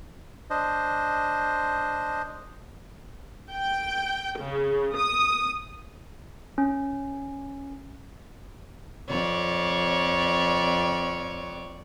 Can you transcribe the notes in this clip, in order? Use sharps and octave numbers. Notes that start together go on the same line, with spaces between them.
D4 C5 D#5
G5
C#3
D#6
C#4
F2 C#5 D5